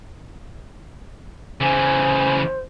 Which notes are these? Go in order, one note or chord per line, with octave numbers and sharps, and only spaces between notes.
C#3 E3 C5 G#5